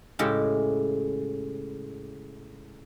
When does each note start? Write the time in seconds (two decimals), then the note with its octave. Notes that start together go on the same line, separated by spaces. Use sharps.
0.19 A2 C#3 G#3 G4